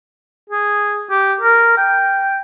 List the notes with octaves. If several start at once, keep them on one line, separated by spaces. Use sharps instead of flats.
G#4
G4
A#4
G5